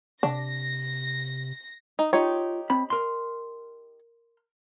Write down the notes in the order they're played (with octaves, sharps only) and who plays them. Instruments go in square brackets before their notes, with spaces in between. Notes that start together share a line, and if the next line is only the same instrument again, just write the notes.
[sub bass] C3 [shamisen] D4 [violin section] A#6
[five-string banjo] D#4
[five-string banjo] D#4 G4 C#5 [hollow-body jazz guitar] F4
[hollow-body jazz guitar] C4 B5
A#4 C6